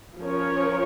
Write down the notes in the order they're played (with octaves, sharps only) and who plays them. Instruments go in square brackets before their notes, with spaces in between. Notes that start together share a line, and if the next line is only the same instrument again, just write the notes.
[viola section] F3 C#4 A#4 C#5